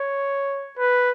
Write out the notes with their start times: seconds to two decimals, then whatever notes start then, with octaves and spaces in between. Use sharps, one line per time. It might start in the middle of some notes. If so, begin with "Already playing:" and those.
Already playing: C#5
0.78 B4